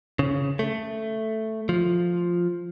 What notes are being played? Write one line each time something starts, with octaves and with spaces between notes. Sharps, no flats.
C#3
A3
F3